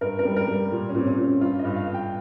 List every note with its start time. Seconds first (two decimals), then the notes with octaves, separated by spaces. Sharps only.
0.01 G2 A#4
0.19 A#4
0.25 G3
0.36 A#4
0.48 G3
0.72 A#2
0.89 C#4
0.95 A#2 C4
1.07 C#4
1.18 A#2
1.23 C#4
1.41 G2 F4
1.59 D#5
1.65 G2
1.76 F5
1.88 G2
1.94 G5